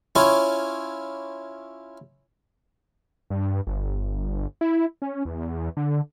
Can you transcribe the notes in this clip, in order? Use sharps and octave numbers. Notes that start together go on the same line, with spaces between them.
C#4 E4 F4 C#5
G2
G1
E4
C#4
E2
D3